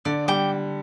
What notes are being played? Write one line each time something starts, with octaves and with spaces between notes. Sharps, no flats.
D3 D5
G3 G5 D6